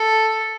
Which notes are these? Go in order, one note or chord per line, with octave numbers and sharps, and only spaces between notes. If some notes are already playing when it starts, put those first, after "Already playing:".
Already playing: A4